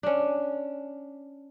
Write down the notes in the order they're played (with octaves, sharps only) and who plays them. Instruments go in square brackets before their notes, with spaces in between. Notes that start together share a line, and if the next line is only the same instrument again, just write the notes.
[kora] C#4 D4